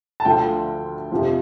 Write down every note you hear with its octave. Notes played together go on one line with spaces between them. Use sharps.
A5
D2 D3 F3 G5
F2 C3 F3